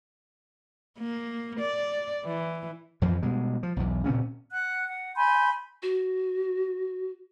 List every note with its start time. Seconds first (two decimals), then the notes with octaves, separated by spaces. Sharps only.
0.99 A#3
1.59 D5
2.25 E3
3.02 F2 E3 F3
3.22 B2 G3 G#3
3.63 F3
3.76 B1 E2
4.06 A#2 C#3 C4 C#4
4.51 F#5 F#6
4.88 F#5
5.16 G#5 B5 C6 G6
5.82 F#4